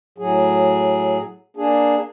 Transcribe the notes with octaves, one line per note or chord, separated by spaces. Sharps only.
A2 F#3 G#4
A#3 D4 G#4